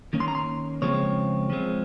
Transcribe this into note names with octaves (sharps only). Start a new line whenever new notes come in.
D#3 A#3 C#4
C6
A#5
C6
C#3 F3 G#3 C4 C#5
F3 G#3 C4